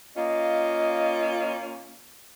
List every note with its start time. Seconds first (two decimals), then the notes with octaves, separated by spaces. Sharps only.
0.16 A#3 C#4 F4 D#5